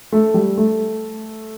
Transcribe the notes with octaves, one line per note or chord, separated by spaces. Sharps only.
A3
G3
A3